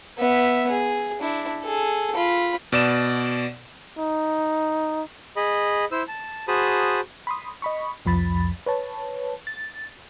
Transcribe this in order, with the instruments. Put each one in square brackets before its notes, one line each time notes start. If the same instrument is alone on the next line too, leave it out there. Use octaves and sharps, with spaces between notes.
[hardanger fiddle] B3 E5
G#4
D4 E4
G#4 A4
F4 B5
[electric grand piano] B2 D5 E7
[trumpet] D#4
[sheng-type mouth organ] G#4 D#5 B5
E4 C5 E6
A5
F#4 G#4 C5 A5 B5 D#6
[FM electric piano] B5 C6 D#6
D#5 B5 C#6
C2 F2 F3 B5 A6
B4 C#5 A5
A6